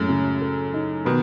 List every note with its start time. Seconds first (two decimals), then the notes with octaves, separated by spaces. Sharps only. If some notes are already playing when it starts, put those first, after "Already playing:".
Already playing: F#2 A2 G#3
0.09 C#3
0.41 A4
0.73 D#4
1.05 B2 D#3 B3